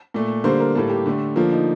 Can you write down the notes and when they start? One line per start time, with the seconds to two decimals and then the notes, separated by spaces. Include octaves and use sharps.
0.14 A#2 A3
0.44 D3 G3 A#3 C5
0.60 A#4
0.75 A2 G3 A#3 A4
0.90 G4
1.06 D3 A3
1.36 D3 F3 A#3 F4
1.52 D#4